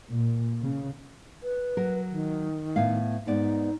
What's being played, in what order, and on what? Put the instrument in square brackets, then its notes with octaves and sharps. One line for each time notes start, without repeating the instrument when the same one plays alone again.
[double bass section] A#2
C#3
[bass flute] B4
[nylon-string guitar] F#3 A#4
[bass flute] D#3
[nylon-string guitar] A2 B3 F5
[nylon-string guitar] G#2 B3 D5 [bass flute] D#4